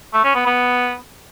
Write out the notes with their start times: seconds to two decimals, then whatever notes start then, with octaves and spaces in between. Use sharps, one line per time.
0.13 A3
0.24 C#4
0.35 B3
0.46 B3